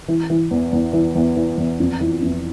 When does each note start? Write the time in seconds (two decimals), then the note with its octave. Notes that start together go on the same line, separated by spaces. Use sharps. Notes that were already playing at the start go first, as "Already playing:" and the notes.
0.08 E3
0.30 E3
0.51 E2
0.73 E2
0.93 E3
1.15 E2
1.37 E3
1.58 E2
1.80 F2
2.01 E3
2.23 F2